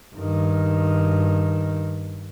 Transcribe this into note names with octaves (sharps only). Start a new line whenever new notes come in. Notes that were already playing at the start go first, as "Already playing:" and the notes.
G2 D#3